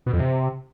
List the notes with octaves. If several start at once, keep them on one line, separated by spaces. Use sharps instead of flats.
B2
F2
C3